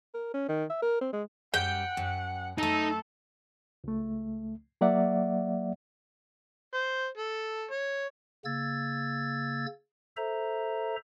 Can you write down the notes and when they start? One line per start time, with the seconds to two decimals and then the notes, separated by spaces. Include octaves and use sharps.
0.14 A#4
0.34 C#4
0.49 D#3
0.70 E5
0.82 A#4
1.01 C4
1.13 G#3
1.54 F#2 G3 F#5 G5
1.97 F#2
2.58 F#2 A3 D#4 A4
3.84 C#2 A3
4.81 F#3 A#3 D5 E5 F#5
6.74 C5
7.18 A4
7.71 C#5
8.45 C#3 A#3 E6 G#6 A6
10.17 A4 C5 E5 A#5